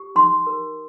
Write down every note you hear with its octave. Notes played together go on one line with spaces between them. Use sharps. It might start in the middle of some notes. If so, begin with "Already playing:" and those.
Already playing: G4
D#4 C6
A#4